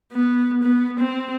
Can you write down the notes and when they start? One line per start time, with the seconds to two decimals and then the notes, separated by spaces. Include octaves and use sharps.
0.12 B3
0.63 B3
0.99 C4